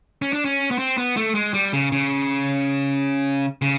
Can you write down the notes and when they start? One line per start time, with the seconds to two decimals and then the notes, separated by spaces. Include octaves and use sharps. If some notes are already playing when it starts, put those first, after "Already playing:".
0.22 C#4
0.33 D4
0.45 C#4
0.71 B3
0.79 C4
0.98 B3
1.16 A3
1.35 G#3
1.54 G3
1.73 C#3
1.92 C#3
3.62 C#3